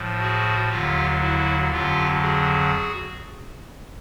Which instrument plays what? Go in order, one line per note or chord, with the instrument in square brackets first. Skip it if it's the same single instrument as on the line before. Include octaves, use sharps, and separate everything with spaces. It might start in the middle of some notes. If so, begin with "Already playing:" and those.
Already playing: [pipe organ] A2 F3
F#4 G#4
D#2 D3 F#3 F4 G4
E4 F#4
F2 D3 F#3 F4 G4
F#4 G#4